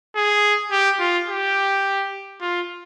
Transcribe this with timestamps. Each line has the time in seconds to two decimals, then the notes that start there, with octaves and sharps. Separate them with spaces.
0.16 G#4
0.71 G4
1.00 F4
1.28 G4
2.41 F4